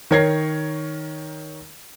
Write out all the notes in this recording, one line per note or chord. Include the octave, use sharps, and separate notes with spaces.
D#3 A#4 C#5 G#6 A#6 C7